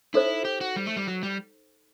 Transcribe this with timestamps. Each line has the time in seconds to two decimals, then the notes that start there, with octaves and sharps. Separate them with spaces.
0.14 D#4 E4 A4 C5
0.45 G4
0.61 F#4
0.76 G3
0.86 A3
0.97 G3
1.07 F#3
1.23 G3